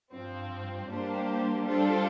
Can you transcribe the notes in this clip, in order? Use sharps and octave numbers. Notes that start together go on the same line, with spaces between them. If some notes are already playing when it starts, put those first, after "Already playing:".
G2 F3 C4
G3 A#3 D4 G4 C5
G3 D4 F4 A4 C5